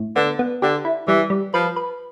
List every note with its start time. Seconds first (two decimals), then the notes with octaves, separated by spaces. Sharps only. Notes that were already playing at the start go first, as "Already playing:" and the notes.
Already playing: A2
0.16 D3 B3
0.39 B3
0.62 D3 G4
0.85 E4
1.07 E3 G3
1.30 G3
1.54 F3 B4
1.76 B4